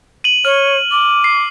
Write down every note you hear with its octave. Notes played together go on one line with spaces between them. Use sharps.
D#7 F#7
C#5 F6
D6
C7